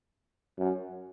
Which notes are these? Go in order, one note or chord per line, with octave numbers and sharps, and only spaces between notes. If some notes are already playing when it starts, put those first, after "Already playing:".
F#2